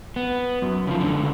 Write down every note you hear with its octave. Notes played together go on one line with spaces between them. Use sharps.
B3
F#2
C#3 F3
C#2 D3